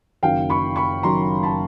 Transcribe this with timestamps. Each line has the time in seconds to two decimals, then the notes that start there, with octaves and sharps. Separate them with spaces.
0.23 F#1 F#2 D#3 F#3 F5 G5
0.50 B5 C#6
0.76 B5 C#6
1.03 F#1 F#2 D#3 F#3 A#5 C6
1.43 A5 B5